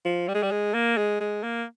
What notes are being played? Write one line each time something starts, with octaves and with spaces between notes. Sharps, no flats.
F3
G3
G#3
G3
G#3
A#3
G#3
G#3
A#3